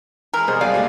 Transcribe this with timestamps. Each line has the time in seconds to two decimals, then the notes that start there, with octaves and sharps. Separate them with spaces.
0.34 E3 G#3 A#4
0.48 B2 G3 G#4 C5
0.61 G#1 F#3 D5 F5 G5 G#5
0.74 D2 A#2 G3 A3 A#3